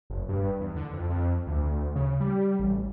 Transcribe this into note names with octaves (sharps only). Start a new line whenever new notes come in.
F#1
G2
E2
D3
F2
F2
D2
C#3
G3
A1